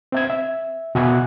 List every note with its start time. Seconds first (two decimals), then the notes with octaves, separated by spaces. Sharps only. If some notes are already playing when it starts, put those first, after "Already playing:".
0.12 C4 E5 G#6
0.30 E5
0.95 B2 F#4 E5 F#5 G#5 F#6